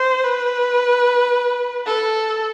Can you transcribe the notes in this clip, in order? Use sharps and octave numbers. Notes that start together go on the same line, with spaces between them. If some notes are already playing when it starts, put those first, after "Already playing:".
Already playing: C5
B4
A4